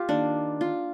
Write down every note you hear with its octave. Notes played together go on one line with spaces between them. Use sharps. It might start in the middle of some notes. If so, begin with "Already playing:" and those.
Already playing: F4 G4
D#3 A#3 D4
F4